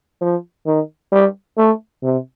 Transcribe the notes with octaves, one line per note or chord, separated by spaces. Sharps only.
F3
D#3
G3
A3
C3